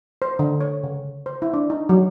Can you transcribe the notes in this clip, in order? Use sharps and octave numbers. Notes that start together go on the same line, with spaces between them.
C5
D3
C#5
C#3
C5
E4
D4
D#4
F#3